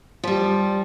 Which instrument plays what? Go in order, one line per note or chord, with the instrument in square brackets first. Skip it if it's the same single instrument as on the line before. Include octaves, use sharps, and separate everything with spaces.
[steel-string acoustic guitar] F3 G3